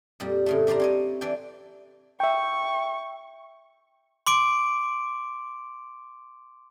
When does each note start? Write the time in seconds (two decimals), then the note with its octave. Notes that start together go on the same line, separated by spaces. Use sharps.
0.20 F2 A#2 G3
0.46 A2 C#3 A3
0.67 G3 D4 C5 D5 A#5
0.80 C4 C#5 D#5
1.21 E3 D4 D5 G5
2.20 E5 G5 C#6
4.27 C6 D6 D7